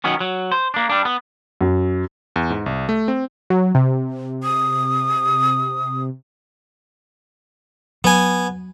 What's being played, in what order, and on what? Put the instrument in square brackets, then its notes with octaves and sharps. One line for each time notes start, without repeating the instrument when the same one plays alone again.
[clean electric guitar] D#3 F#3 B3 C#4
F#3
C5
A#3 D4
G3 D4
B3
[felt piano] F#2
[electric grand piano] E2
G#2
C2
A3
C4
[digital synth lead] F#3
C3
[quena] D#6
[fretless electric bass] F#3 [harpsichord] B3 G#5